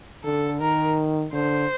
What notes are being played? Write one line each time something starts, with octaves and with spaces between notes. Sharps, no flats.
D3 A4
D#3 A#4
D3 C5